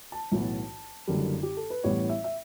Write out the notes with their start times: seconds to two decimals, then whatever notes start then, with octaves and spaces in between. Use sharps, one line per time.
0.12 A5
0.32 B1 A2 E3 B3
1.07 F#1 F#2 D3 G3
1.43 G4
1.57 A4
1.70 B4
1.83 A1 A2 G3 B3 C#5
2.09 E5
2.24 E5